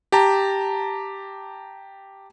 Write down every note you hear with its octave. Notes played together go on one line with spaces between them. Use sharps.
G4 A5 A#5